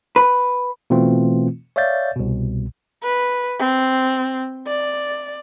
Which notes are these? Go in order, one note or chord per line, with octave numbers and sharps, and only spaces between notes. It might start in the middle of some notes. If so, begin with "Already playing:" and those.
B4
B2 E3 A3 C4 F4
C#5 D5 E5 F5 G6 A6
C2 B2
B4
C4
D5